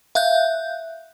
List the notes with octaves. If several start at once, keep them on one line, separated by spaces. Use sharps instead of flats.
E5 F5 F#6 G6